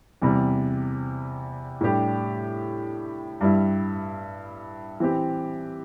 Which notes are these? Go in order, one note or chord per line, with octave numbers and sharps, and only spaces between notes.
E2 C3 G3
A2 G3 D4 G4
G2 G3 E4
E3 C4 G4